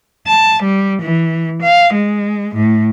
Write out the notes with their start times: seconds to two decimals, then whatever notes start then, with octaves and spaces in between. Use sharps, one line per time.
0.27 A5
0.62 G3
1.01 E3
1.61 F5
1.93 G#3
2.55 A2